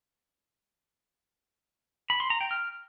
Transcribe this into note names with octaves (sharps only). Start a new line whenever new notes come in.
B5
C6
A#5
G5
F6